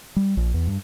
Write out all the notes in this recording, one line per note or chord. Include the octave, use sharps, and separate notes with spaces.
G3
A#1
E2
G2